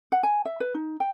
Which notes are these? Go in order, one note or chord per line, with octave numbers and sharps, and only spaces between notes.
F#5
G#5
E5
B4
D#4
G5